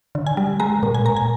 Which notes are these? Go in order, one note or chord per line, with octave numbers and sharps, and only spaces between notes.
D3
G#5
G3
G#3 A#5
A#2
G#5
A#2 A#5
G#5